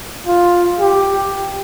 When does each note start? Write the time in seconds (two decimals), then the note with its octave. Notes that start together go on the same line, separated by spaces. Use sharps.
0.27 F4
0.79 G4